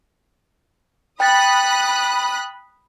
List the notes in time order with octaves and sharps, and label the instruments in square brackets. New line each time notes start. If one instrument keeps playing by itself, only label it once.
[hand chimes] G5 A6 [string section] B5 D#6 F#6